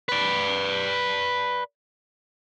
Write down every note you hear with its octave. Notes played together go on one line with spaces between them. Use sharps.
B4 D5